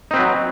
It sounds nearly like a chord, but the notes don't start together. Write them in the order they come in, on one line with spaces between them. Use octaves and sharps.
D#4 C4 B4 F#3